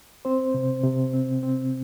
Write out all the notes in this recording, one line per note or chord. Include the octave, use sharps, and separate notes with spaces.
C4 C5
C3
C3
C4
C4